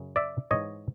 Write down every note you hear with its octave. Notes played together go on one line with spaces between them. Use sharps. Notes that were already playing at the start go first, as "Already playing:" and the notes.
Already playing: F#2 C#3
D5 E5
G#2 E3 C#5 D#5